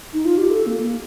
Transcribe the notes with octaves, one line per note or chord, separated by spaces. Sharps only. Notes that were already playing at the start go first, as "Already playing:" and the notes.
D#4
F4
G4
A4
A#3
A#3